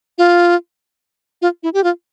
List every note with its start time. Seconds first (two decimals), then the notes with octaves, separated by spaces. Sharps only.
0.18 F4
1.42 F4
1.63 E4
1.74 G4
1.84 F4